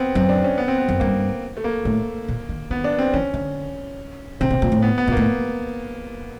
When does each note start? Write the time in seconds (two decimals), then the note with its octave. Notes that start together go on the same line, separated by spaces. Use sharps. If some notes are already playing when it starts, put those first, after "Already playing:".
Already playing: B3 C4
0.15 F#2 C4
0.29 D4
0.44 C#4
0.58 B3
0.68 C4
0.78 B3
0.89 F#2
1.00 G2 A#3
1.57 A3
1.64 A#3
1.85 A2
2.28 A#2
2.49 D#3
2.70 D#3 B3
2.84 D4
2.99 C4
3.14 E3 C#4
3.34 D3
4.41 C3 C4
4.50 B2
4.62 A#2
4.72 A2
4.82 B3
4.98 B3
5.07 A#2
5.12 A2 A#3